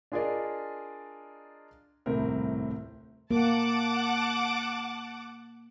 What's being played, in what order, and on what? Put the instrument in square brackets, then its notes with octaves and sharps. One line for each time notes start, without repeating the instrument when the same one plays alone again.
[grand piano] D4 F4 G#4 A#4 D5 D#5
D#1 C2 A2 C3 C4 A#4
[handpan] A#3 [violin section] F#5 A5 D6